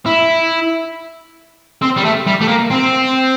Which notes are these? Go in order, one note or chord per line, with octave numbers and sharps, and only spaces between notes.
E4
C4
G3
A3
G3
A3
A#3
C4